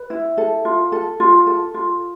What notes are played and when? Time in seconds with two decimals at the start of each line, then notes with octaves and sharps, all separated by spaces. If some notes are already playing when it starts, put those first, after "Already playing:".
Already playing: B4
0.10 E4
0.38 A4
0.65 F4
0.92 A4
1.20 F4
1.47 A4
1.74 F4